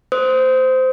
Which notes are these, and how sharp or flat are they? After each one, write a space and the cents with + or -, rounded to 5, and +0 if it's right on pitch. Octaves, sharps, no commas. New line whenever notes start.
C5 -15 D#6 +30